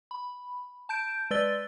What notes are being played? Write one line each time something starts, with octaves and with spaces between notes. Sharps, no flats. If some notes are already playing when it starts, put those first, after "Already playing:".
B5
A5 G6 D7
G#3 B4 D5 E6 A6 G7